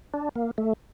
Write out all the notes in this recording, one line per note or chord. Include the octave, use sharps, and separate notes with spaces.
D4
A#3
A3